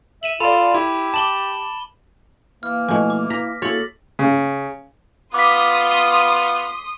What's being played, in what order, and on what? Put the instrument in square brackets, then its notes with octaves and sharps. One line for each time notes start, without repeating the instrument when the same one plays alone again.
[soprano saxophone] E5 [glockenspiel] D#7 E7 F#7
[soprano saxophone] F4 [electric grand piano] A4 D5 [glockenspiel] B5
[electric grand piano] E4 [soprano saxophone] G4 [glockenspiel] B5
[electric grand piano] A5 D6 [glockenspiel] E7 F#7 G7
[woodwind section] E3 A#3 [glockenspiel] F6
[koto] B2 G#5 [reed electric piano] F3 A3 E4
[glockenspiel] D6
[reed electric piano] E4 [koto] A#5 [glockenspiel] A#6 B6
[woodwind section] C#3 A4 [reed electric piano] A#3 E4 F#4 [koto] C#5 [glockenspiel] A6 F#7
[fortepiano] C#3
[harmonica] B3 F4 [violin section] C6 D#6 [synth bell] D6 B6